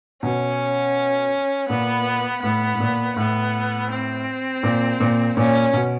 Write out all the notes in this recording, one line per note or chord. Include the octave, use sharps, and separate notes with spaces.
B2 C#4
A#2 B3
A2 B3
A2
A#2
A2 B3
C4
A#2
A#2
A#2 C#4
B2